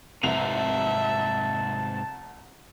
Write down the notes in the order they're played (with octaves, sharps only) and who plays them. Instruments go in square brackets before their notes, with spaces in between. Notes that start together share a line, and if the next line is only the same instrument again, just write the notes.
[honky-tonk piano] F1 C2 F7 [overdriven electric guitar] G#2 C3 [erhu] E5 [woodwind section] A5